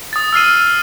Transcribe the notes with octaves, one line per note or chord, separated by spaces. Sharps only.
D#6 A6
E6 F6 C7 D#7